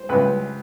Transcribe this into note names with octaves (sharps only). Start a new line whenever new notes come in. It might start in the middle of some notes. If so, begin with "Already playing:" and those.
Already playing: C5
C#2 B4